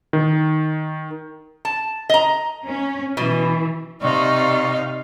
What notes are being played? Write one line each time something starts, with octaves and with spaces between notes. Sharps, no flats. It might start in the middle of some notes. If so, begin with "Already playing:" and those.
D#3
A5
D#5 A#5
C#4
B2 E3
C3 D#4 D5 D#5 F5 C#6